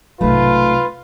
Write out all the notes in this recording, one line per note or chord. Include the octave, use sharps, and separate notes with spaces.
B1 G#2 C3 A3 F4 B4